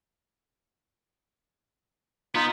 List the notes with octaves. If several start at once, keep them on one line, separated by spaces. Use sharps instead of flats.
B3 D#4 F4